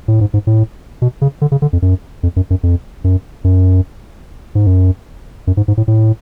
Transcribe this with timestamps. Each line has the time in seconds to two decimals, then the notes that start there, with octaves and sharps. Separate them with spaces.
0.08 A2
0.21 G#2
0.34 G#2
0.47 A2
1.02 B2
1.22 C#3
1.41 D3
1.52 C#3
1.62 D3
1.73 F2
1.82 F#2
2.23 F2
2.36 F#2
2.50 F#2
2.63 F2
3.04 F#2
3.44 F#2
4.55 G#2
4.67 F#2
5.47 F#2
5.57 G#2
5.68 G#2
5.77 A2
5.88 A2